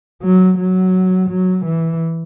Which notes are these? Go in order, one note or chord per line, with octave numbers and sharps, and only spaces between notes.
F#3
F#3
F#3
E3